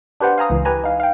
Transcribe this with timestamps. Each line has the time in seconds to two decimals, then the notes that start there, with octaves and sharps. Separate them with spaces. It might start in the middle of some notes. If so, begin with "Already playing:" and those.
0.20 D4 G4 B4 C5 F#5
0.38 F5 G#5 A#5 D#6
0.50 C#2 E3
0.65 G4 B4 G#5 A#5
0.84 D#4 F5
1.00 F5 G5